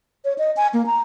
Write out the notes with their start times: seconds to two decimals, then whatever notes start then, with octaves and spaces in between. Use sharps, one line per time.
0.25 C#5
0.38 D#5
0.57 G#5
0.74 A#3
0.86 A#5